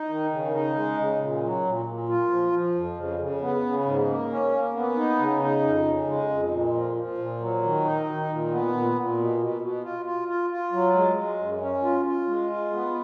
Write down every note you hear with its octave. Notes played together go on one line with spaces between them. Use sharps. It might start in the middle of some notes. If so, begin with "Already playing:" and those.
Already playing: D#4
D#3
C#3
D#4
G#3
C#3
A#2
F#3
A#2
A#2
F4
F3
F3
F2
C#3
C#3
B3
C#3
G#2
A#3
C#4
A#3
B3
D#4
C#3
D#4
F2
C#3
G#3
F2
A#2
F3
F3
A#2
F#3
D#3
D#4
D#3
A#2
B3
A#2
A#2
B2
B2
B2
F4
F4
F4
F4
F#3
G#3
G#3
F#2
C#4
F4
F4
G#3
F4
B3